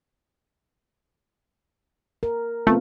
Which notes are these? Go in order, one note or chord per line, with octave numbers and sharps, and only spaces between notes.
A#4
A3 B3 C4 F4